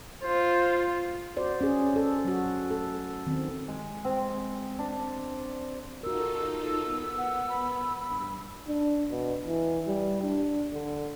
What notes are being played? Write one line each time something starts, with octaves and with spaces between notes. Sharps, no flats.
F4 C5
F#4 C5 D5
C#4 G#4
A4
F#3 F#4
A4
D#3 C4
G#3
C4
D4
D#4 F4 F#4 A4 A#4 E6
B3
F#5
B5
G2 B5
D4
B2
E3
G3
D4
D3